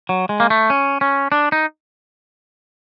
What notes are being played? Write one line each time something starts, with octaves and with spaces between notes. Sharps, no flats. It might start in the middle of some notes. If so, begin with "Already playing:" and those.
F#3
G#3
A#3
A3
C#4
C#4
D4
D#4